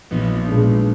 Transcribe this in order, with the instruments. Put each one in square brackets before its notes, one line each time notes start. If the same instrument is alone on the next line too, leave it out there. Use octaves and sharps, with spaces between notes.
[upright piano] A#1 [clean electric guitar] B3 D#4
[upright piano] A#2 G#3 D4